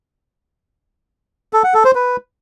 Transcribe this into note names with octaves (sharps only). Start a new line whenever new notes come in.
A4
F#5
A4
C5
B4